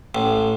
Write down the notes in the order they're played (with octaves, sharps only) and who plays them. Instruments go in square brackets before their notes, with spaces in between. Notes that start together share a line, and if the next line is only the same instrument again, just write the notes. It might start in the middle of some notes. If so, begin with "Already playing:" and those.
[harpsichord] A1